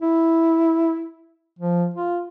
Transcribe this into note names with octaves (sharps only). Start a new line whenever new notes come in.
E4
F3
F4